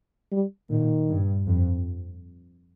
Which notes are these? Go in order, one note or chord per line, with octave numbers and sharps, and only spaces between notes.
G3
A#2 D#3
G2
F2